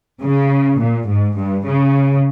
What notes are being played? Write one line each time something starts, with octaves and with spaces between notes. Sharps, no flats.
C#3
A#2
G#2
G2
C#3